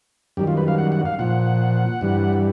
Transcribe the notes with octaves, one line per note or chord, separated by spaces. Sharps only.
F#2 D#3 G3 G4
F4
B4
F5
F#5
F#5
F5
A#2 F3 F#5
G2 E3 G3